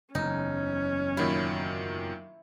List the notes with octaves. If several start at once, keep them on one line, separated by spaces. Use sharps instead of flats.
F#1 E2 C#4 D#4
A#2 D#3 F#3 E4